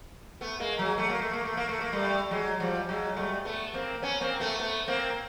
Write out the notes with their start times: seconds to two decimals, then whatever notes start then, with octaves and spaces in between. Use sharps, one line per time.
0.41 A3 B3
0.60 G#3 A#3
0.79 F#3 G#3
0.98 A3
1.09 A#3
1.22 A3
1.33 A#3
1.45 A3
1.57 A#3
1.69 A3
1.81 A#3
1.93 G3 A3
2.31 F#3 G#3
2.60 F3 G3
2.89 F#3 G#3
3.16 G3 A3
3.45 A3 B3
3.74 A#3 C4
4.02 B3 C#4
4.21 A#3 C4
4.40 A3 B3
4.59 A3 B3
4.88 A#3 C4